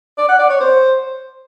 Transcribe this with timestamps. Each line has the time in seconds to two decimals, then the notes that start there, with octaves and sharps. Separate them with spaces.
0.18 D5
0.29 F#5
0.39 D5
0.50 C#5
0.60 C5